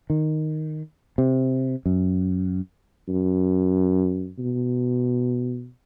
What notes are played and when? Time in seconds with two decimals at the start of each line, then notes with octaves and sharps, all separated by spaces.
0.10 D#3
1.18 C3
1.86 F#2
3.08 F#2
4.39 B2